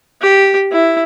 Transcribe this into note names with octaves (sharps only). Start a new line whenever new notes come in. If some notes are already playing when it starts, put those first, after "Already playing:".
G4
E4